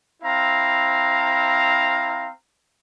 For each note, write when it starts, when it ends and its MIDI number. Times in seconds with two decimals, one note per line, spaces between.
0.23 2.29 60
0.23 2.29 64
0.23 2.29 77
0.23 2.29 82